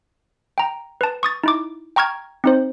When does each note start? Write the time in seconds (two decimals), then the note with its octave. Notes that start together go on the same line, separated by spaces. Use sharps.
0.58 G5 A#5
1.01 B4 A5
1.23 C#6 D#6 A6
1.44 D#4 E4 D6
1.96 G5 A#5 C#6 F6 G#6
2.44 C4 D#4 C5